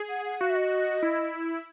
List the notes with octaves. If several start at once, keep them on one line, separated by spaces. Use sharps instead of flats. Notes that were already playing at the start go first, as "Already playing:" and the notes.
Already playing: G#4
F#5
F#5
F#4 F5
E5
D#5
E4